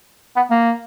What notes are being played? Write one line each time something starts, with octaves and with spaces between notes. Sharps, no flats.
B3
A#3